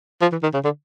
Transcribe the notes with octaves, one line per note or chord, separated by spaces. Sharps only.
F3
E3
D#3
C#3
D3